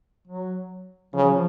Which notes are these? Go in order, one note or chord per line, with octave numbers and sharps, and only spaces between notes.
F#3
C#3 F3
F#3
F3